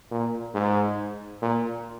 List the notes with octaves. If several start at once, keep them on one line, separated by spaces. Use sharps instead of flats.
A#2
G#2
A#2